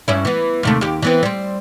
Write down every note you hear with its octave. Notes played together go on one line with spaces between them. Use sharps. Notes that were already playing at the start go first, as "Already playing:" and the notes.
G2 C#4 E4
E3 B3
D#2 C3 A3
D#2 G4
E3 B3 C4
G3 C4